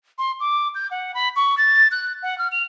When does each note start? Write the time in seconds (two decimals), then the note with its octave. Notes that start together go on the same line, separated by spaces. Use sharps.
0.18 C6
0.40 D6
0.75 G6
0.91 F#5
1.14 B5
1.36 C#6
1.58 A6
1.91 F#6
2.23 F#5
2.38 F6
2.52 F7